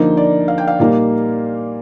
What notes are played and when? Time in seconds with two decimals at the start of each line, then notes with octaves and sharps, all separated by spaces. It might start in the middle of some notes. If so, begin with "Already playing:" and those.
Already playing: D3 F3 A#3 D#4
0.17 D5
0.48 F5
0.58 G5
0.67 F5
0.80 A#2 G3 A#3 D#4